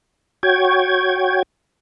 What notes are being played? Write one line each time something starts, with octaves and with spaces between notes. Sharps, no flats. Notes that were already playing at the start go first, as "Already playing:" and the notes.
F#4 C#5 G5 G#6